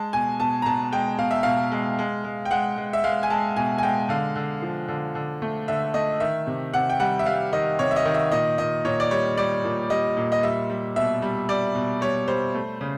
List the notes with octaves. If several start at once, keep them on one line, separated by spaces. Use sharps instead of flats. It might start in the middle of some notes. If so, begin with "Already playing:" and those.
Already playing: G#3 A5
B2 G#5
B2 A5
A#5
B2 A5
G#3 G5
B2 F5
E5
B2 F5
G#3
G#3
G#3
G5
G#3 F#5
G#3
E5
G#3 F5
G#5
G#3 A5
B2 G#5
G#5
G#3 G5
D3 F5
D3
F3
D3
D3
A3
D3 E5
A3 D#5
D#3 E5
C3
C3 F#5
G5
G3 F#5
E5
G3 F5
D#3 D#5
C3 C#5
E5
D#5
D#3
E5
A#2 D#5
A#2 D#5
A#2 C#5
D5
G3 C#5
G3 D5
A#2
G3 D#5
A#2
D#5
G3 E5
G3
B2 E5
G3
G3 D5
B2
G3 C#5
G3 C5
A3
C#3